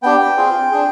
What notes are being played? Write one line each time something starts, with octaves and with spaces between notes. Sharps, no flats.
B3 D4 G4 G5
C4 F4 G#4
D4 G#4